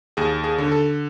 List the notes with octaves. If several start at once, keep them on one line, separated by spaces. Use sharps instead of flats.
D#2 G#4
G#4
D3
A4